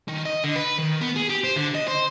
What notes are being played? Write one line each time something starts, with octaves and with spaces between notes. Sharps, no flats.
D#3
D#5
D3
B4
D#3
B3
G#4
G4
C5
D3
D#5
C5